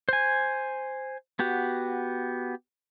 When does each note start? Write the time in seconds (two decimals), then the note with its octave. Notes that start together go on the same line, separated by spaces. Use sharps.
0.09 C5 G#5
1.39 B3 F#4 G4